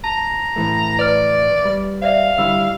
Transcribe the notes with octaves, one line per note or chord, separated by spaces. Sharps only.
A5 A#5
A2 E3 A3
B4 D5 F6
G3
C5 D5 E5 F5
D3 G3 E4 E6